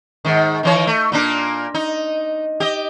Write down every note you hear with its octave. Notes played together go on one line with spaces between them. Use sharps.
G#2 D#3
D#3 E3 C#5
A3
A#2 A#3 D4
D#4
G4 D#5